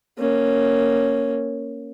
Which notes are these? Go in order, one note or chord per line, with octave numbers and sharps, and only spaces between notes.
A#3 C#4